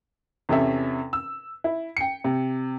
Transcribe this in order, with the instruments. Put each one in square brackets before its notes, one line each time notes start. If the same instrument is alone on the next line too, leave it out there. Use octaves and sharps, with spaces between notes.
[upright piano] E2 C3 C#4 A4 E5
E6
E4
G5 C#7
C3